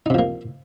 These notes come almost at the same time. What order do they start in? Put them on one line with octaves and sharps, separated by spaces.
D#4 C3 F3 A#3